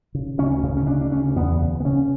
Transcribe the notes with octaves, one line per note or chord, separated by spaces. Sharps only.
C#3
D2 C#4
C#3
C#4
D2 D4
D4
D2 C#4
E2 B3
C#3
B3
C#3 C#4